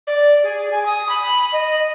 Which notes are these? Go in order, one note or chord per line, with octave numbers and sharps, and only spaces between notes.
D5
G#4
G#5
D#6
B5
D#5